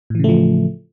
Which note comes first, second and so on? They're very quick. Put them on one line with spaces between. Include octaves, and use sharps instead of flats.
A2 E3 C#3 A3 F3